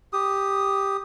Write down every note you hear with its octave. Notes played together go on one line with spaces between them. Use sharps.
G4 D#6